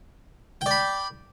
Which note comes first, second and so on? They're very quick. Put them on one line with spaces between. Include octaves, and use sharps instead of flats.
G5 D5 B5